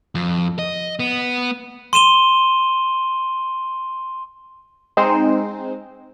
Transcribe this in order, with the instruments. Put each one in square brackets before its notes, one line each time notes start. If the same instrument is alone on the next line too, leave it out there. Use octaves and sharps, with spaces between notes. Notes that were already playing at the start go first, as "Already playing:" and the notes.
[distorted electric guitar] F2
D#5
B3
[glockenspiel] C6 D#7 E7 G7
[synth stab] G#3 C4 D#4 C5